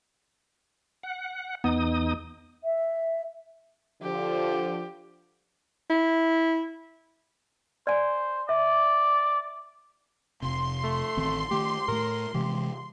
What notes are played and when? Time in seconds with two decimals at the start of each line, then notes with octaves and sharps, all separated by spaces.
1.03 F#5
1.64 E2 B3 D#4 D#6
2.64 E5
4.02 D3 F3 G4
5.90 E4
7.87 C5 D5 G#5
8.49 D5 E5
10.42 F1 C3 C6
10.84 A3
11.17 A1 D#3 C4
11.51 D#3 A3 G4
11.88 A2 A3 A#4
12.34 C3 E3 G#3 G4